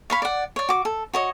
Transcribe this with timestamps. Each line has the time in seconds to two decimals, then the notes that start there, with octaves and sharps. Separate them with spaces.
0.10 C#5 F5 B5
0.22 D5 F#5
0.56 C#5 D5
0.69 F#4 D6
0.85 A4
1.14 F#4 C#5 D#5